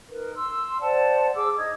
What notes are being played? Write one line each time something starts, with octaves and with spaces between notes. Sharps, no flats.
D#4 A#4 B4
C6 E6
C5 D5 F#5 A5
G#4 D6 E6
D#4 D#5 D#6 G#6